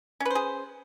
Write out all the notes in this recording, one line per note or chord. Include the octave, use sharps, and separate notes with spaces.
C#4 G#4 B4 C5